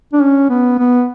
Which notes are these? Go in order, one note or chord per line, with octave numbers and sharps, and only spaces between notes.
D4
C#4
B3
B3